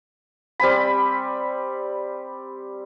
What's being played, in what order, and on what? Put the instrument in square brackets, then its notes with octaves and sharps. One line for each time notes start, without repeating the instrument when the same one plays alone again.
[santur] G3 C4 G#5 B5